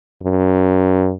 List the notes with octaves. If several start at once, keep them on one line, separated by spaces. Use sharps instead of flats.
F#2